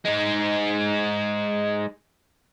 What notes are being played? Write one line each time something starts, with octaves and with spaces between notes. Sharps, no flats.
G#3 D#4